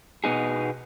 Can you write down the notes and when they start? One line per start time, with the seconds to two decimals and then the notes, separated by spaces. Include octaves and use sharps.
0.24 B2 B3 D#4 G#4